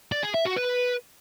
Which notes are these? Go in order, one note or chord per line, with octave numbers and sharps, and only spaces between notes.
D5
G#4
E5
F#4
B4